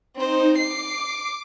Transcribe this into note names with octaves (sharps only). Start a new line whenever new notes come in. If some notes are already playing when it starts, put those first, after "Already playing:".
C4 D#4 C5
D6 C7